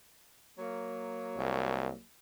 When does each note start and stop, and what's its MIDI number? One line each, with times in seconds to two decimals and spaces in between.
0.59 2.02 54
0.59 2.02 58
1.37 1.90 36